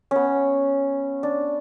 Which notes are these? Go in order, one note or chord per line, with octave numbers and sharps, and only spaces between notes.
B3 C#4
D4